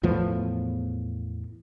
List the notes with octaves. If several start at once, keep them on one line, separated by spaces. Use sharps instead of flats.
E2 A2 F3 B3